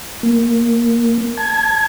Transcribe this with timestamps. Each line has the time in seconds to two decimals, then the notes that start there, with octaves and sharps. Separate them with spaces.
0.23 A#3
1.37 A5 G#6